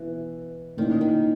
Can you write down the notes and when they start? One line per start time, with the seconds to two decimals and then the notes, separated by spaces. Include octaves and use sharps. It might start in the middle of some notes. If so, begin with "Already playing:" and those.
Already playing: B2 E3
0.77 A#2 D#3 A#3 C#4 E4
1.01 D#3